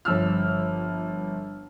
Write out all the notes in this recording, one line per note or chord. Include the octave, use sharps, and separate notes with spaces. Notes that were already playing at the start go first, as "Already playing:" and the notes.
G1 F3 E6 F6